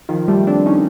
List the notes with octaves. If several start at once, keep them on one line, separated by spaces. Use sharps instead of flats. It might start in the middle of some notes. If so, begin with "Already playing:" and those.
D#3 F3
G3 A3
C4 D4
C#4 D#4